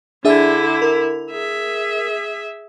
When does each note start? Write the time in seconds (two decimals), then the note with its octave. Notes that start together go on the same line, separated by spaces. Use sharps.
0.25 D3 D4 E4 G#4 E5
0.82 A#4
1.31 G#4 E5